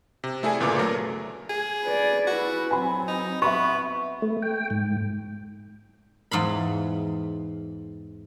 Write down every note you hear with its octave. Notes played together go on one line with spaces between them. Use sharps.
C3
A3 E4 G#4 A4 D5 G#5
G1 A#2 C#3 B4 D5 D6
F#3 A3 A#4
G#4
B4 D5
E4 F#4 B4
F#3 C4 G#5 B5
D#4
B3 E5 B5 C#6
A3
G5
G#2
E2 G#2 F5 B5